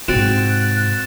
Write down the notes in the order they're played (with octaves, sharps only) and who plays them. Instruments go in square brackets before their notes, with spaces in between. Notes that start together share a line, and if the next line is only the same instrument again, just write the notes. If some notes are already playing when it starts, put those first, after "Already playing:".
[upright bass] G#2 C3 [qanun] C4 F#4 [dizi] F#6 [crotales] A6 D7 E7